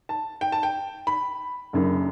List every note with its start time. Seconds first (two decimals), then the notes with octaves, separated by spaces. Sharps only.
0.09 A5
0.41 G5
0.52 A5
0.63 G5
1.07 B5
1.73 F#1 F#2 D3